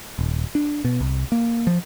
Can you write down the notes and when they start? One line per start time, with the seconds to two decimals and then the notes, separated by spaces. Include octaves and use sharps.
0.19 D#1
0.55 D4
0.85 B2
1.00 C2
1.32 A#3
1.67 F3